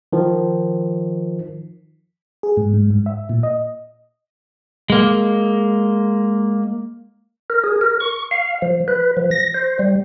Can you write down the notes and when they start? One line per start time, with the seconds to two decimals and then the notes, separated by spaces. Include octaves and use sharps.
0.13 D#3 F3
2.43 G#4
2.57 G#2
2.74 G#2
2.90 G#2
3.06 E5
3.29 A#2
3.43 D#5
4.90 G#3 A#3
7.50 A#4
7.64 G#4
7.81 A#4
8.00 C#6
8.31 F5
8.62 F3
8.88 B4
9.17 F3
9.31 A#6
9.54 C5
9.79 G3